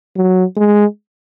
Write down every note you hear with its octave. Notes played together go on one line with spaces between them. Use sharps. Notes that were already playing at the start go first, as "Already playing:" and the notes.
F#3
G#3